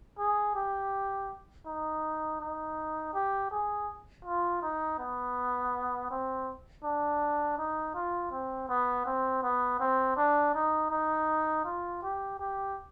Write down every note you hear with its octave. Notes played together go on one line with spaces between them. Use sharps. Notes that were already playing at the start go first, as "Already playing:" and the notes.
G#4
G4
D#4
D#4
G4
G#4
F4
D#4
B3
C4
D4
D#4
F4
C4
B3
C4
B3
C4
D4
D#4
D#4
F4
G4
G4